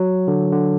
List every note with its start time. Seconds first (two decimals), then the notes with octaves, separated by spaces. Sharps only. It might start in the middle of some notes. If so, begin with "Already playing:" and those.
Already playing: F#3
0.28 D3
0.52 D3